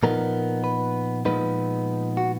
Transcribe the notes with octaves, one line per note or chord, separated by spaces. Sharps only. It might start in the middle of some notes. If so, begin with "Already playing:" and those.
A#2 F3 B3 D#4 A#4
B4
A#2 F3 G#3 B3 D#4 B4
F#4